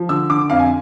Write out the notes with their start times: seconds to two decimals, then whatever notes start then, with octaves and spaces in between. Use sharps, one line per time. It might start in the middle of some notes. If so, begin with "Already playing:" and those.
Already playing: F3
0.09 D3 E6
0.30 D3 D6
0.50 F2 F5
0.59 G#5